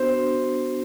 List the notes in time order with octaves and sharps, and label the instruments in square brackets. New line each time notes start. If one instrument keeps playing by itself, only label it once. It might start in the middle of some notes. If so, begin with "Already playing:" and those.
Already playing: [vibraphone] B3 D4 F#4 [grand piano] C5
[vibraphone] B3 D4 F#4